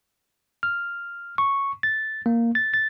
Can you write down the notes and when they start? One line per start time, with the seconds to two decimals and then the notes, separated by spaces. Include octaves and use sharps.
0.63 F6
1.38 C#6
1.83 A6
2.26 A#3
2.55 A6
2.74 A6